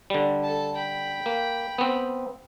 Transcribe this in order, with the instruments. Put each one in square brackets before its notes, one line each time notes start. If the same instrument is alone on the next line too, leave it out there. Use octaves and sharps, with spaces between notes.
[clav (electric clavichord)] D3 G3
[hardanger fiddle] A4 A5
G5 B5
[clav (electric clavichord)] A#3
B3 C4